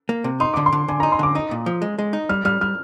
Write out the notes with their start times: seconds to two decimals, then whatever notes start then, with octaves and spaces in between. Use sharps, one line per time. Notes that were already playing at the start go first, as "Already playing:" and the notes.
0.09 A#3
0.24 C3
0.40 D#4 C6
0.54 D3 D6
0.66 C6
0.73 D3
0.88 D3 G#5
1.00 D#4 A#5
1.12 C6
1.19 D3 D6
1.35 D#4 D#6
1.51 A#2
1.66 F3
1.82 G#3
1.99 G#3
2.13 D#4
2.29 G3 F6
2.45 G3 F6
2.61 G3 F6